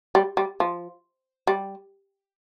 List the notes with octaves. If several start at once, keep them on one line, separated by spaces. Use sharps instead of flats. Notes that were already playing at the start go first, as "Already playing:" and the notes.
G3
G3
F3
G3